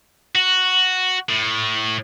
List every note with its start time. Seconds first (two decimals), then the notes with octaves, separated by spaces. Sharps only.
0.35 F#4
1.29 A2